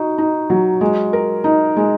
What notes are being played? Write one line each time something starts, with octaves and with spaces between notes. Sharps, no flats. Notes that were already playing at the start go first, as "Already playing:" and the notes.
Already playing: D#4 F#4
D#4
F#3
G#3
A#4
D#4
G#3